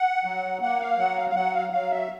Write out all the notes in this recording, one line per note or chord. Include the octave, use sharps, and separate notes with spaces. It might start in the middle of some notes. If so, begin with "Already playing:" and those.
Already playing: F#5
F#3
A#3 F#5
F5
F#3 F#5
F5
F5
F#3 F#5
F5
F#3 F5
E5